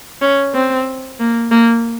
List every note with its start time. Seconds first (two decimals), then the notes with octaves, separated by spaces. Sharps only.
0.21 C#4
0.54 C4
1.20 A#3
1.51 A#3